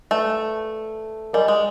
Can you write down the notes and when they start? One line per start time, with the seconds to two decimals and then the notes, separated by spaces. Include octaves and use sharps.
0.11 A3 B4 D5 F5
1.33 G3 A#4 D#5 G#5 C6
1.48 G#3